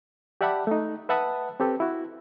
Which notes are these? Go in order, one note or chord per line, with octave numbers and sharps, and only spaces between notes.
G4 D5 E5 F#5 A5 B5
A3 D#4
B4 E5 F#5 A5 B5 D#6
C4 G4 A4 B4
E4 F#4